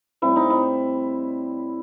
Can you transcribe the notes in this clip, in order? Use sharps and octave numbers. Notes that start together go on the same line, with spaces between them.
A2 G3 C4 E4
D#4
E4